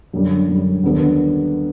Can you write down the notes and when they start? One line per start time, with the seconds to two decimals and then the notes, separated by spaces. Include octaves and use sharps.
0.13 F#2 D3 G3
0.48 F#2 D3 G3
0.83 D#2 D3 G3 B3 D4